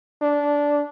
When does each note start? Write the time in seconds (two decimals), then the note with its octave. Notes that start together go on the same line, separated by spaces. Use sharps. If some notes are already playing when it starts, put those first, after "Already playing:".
0.22 D4